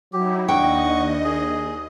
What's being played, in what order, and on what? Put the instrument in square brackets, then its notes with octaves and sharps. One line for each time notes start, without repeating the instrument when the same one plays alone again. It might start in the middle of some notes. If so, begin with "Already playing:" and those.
[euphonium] F#3 [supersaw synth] D#4 E4 [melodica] G4
[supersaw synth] D#2 D#5 [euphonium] D4 [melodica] F#5 C#6 [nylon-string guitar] G5
[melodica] G#4